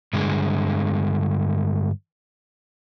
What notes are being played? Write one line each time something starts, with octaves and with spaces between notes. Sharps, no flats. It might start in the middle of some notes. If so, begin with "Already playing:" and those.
G2 D3 G#3